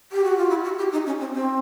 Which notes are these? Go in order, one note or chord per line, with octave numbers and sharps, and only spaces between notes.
G4
F#4
F4
E4
F#4
G4
D#4
C#4
C4
C4